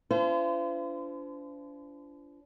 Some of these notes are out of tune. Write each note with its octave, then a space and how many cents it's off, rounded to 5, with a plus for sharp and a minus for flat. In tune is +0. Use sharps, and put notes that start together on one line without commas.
D4 -40 F4 -45 C5 -35